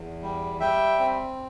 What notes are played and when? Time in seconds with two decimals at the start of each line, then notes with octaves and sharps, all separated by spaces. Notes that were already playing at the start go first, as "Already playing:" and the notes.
Already playing: E2
0.22 G3
0.60 G3 E5 G5
0.99 C4